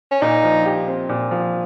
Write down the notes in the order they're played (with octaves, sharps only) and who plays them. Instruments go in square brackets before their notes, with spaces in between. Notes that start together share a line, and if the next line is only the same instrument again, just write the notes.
[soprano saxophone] C#4
[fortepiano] A#2 [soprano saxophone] D#4
[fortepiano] F3
G4
C4
A#2
F3